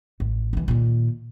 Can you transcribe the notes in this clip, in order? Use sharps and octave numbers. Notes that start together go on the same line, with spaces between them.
A1
C2 E3
A#2 D#3